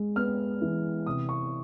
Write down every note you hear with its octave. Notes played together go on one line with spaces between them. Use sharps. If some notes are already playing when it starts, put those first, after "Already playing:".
Already playing: G#3
B3 F6
E3
C3 D#6
C#6